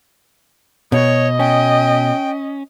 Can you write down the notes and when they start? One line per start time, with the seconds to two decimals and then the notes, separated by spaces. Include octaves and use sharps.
0.92 B2 C#5 D#5
1.39 C#4 G5